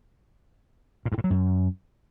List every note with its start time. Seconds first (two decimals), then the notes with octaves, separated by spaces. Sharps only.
1.05 A#2
1.12 G2
1.18 A2
1.24 F#3
1.30 F#2